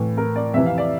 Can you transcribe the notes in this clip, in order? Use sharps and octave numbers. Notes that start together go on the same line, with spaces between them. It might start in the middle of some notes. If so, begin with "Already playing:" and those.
Already playing: A2 E3
A#4
D5
F2 C3 E3 E5
F5
D5